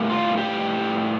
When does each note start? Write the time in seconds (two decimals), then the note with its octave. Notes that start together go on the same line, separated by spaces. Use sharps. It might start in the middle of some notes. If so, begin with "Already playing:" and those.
Already playing: A2 G3 A#3
0.09 F4
0.37 G4